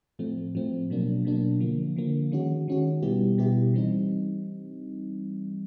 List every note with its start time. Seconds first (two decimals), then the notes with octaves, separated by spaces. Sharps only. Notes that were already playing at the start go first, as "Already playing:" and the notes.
0.19 A2 F3 A3 C4
0.55 A2 F3 A3 C4
0.90 B2 F#3 A#3 D4
1.25 B2 F#3 A#3 D4
1.60 D3 F3 A#3
1.96 D3 F3 A#3
2.32 D#3 G#3 C#4 F#4
2.68 D#3 G#3 C#4 F#4
3.02 B2 G3 B3 E4 G4
3.38 B2 G3 B3 E4 G4
3.74 C3 E3 G3 C4 D#4